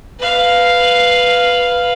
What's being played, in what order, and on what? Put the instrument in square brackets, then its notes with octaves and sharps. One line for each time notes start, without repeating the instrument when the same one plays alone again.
[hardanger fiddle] B4 F5